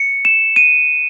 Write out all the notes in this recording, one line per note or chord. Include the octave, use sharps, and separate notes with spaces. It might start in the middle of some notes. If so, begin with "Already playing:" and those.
Already playing: C#7
E7
D#7